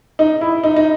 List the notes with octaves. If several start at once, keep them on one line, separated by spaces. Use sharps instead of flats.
D#4
E4
D#4
D#4